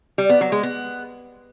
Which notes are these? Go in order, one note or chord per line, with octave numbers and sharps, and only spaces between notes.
G3
B3
F#3
G#3
B3